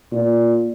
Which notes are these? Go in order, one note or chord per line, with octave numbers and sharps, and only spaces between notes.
A#2